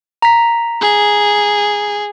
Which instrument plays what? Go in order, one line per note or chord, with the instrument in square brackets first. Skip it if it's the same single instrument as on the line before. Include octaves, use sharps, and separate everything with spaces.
[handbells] A#5 B6
[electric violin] G#4